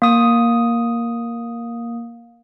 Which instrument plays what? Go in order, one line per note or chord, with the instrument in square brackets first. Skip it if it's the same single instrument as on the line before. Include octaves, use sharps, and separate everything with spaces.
[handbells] A#3 D#6